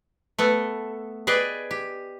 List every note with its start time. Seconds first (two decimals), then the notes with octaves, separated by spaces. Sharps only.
0.38 A3 B3 A4
1.27 G#4 B4 D5 D#5 G5
1.71 G4